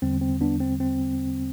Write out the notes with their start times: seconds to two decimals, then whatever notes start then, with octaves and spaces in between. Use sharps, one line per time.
0.02 E2 D3 G3 C4
0.21 C4
0.41 B3 D4
0.60 C4
0.80 C4